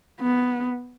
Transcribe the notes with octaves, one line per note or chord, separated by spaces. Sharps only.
B3